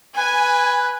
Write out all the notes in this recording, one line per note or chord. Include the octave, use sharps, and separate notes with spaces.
B4 G#5